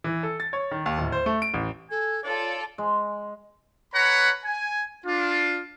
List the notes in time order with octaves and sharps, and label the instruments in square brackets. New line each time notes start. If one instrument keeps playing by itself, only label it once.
[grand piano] E3
A4
A6
C#5
D#3
D#2
D1
C5
A3
D7
A1
[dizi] A4 [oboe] G#5
[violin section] F4 A4 [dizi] C#5 [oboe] D5
[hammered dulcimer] G#3
[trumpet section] B4 C#5 F#5 A#5 B5
G#5
D4 F4